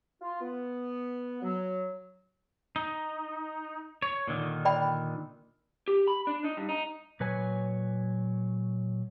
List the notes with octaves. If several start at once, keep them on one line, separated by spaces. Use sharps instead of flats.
F4
B3
F#3
D#4
C#5
A#2 D3 D#3
D5 G5 B5
G4
B5
D4
D#4
G2
D#4
A#2 F#3 B4 C#5 G#5